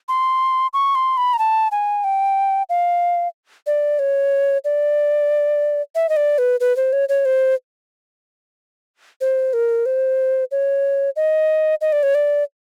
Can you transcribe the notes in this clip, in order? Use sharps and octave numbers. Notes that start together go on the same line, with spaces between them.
C6
C#6
C6
B5
A#5
A5
G#5
G5
F5
D5
C#5
D5
E5
D#5
D5
B4
B4
C5
C#5
C#5
C5
C5
A#4
C5
C#5
D#5
D#5
D5
C#5
D5